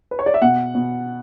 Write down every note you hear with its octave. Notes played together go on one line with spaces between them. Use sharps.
B4
C#5
D5
E5
B2 F#5
B2